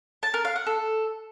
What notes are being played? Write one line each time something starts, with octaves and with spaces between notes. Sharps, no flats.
A5
A#4
F5
F#5
A4